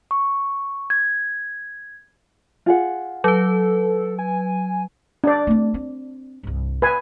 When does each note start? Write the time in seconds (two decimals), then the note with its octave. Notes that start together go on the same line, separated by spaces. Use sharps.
0.11 C#6
0.90 G#6
2.66 F4 G#4 F#5
3.24 F#3 A4 B4
4.19 G#5
5.24 D4 D5
5.47 A3 C4
5.74 C4
6.43 C2 G2
6.82 B4 G#5